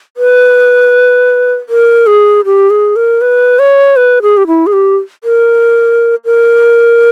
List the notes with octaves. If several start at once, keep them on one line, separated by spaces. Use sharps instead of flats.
B4
A#4
G#4
G4
G#4
A#4
B4
C#5
B4
G#4
G4
E4
G#4
G4
A#4
A#4